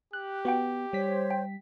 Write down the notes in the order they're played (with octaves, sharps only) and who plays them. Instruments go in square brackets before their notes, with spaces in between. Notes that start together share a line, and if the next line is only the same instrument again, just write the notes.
[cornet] G4 [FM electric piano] F#6
[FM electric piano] B3 [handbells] F#4 F#5 G5
[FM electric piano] G3 B6 [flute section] C5 C#5
[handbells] G5